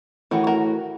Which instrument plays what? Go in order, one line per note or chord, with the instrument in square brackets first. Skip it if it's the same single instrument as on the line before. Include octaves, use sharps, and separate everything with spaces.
[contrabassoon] A2 [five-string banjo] D#3 E3 F#4
[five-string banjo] F#4 A#4